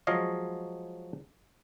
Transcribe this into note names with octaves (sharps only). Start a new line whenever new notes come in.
F3 F#3 G#3 C#5 D#5 F5